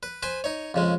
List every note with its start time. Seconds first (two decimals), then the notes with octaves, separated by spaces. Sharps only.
0.03 B4
0.23 B4 C5 G#5 B5
0.44 D#4 C#5
0.74 F2 C#3 G#3